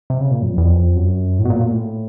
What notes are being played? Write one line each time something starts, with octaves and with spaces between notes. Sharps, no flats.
C3
C#3
A#2
F#2
F2
E2
F2
F#2
A2
B2
A#2
A#2
A2